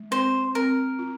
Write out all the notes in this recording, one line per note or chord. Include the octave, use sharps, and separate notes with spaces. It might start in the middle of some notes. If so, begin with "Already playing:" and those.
Already playing: G#3
C4 C5
C4 A#4
F4